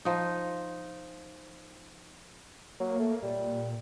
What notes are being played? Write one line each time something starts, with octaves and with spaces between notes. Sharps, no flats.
F3 D#4
F#3 A#3
A3
A#2 G3